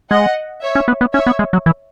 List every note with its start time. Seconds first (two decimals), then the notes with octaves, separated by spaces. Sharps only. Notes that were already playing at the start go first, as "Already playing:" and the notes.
0.10 G#3 D#5 F#5
0.61 C#5 E5
0.75 C#4
0.88 B3
1.01 B3
1.14 C#4 C#5 E5
1.27 B3
1.39 G#3
1.53 F#3
1.66 E3